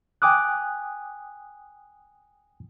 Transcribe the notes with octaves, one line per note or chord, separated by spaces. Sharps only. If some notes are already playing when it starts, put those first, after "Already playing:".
G5 G#5 D6 D#6 F#6